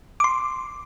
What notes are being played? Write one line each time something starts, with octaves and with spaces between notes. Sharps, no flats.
D6
C6